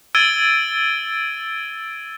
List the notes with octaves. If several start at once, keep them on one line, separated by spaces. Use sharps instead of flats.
E6 G#6 A6 D7 D#7 G7